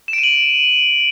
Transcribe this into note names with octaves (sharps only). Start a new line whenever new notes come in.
E7
D7
D#7
F#7